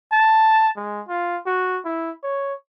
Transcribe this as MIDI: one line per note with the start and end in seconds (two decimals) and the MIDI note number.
0.12 0.68 81
0.77 1.01 56
1.08 1.38 65
1.47 1.80 66
1.85 2.10 64
2.23 2.53 73